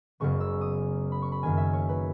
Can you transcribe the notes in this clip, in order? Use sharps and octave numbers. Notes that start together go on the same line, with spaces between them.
F#1 F#2 C#3 G#3 B3 C#6
E6
D#6
B5
C#6
B5
F#2 D#3 A#3 G#5
E5
C#5
B4